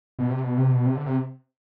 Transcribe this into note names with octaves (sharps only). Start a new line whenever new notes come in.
B2
C3
B2
C3
B2
C3
D3
C3